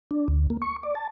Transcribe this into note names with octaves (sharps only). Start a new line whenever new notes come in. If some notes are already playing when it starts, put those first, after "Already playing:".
D4
D2
A#3
C#6
D5
A5